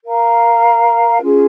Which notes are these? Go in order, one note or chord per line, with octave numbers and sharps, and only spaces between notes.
A#4 F5 A#5
C#4 F4 G#4